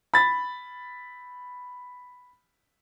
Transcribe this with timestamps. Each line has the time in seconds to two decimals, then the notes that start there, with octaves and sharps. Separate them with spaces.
0.14 B5 A6